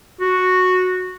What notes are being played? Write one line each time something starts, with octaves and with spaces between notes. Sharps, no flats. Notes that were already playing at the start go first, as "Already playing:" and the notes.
F#4